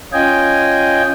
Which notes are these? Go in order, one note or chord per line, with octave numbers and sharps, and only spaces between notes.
C#4 F4 D#5 G5 G#5